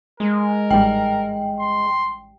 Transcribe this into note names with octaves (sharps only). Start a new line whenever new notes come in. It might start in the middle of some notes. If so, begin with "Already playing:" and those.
G#3 A#4
A1 G#2 G3 G5
C6